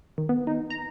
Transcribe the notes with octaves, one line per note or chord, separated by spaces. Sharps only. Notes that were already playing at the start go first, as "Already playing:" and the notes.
D#3
B3
D#4
A#5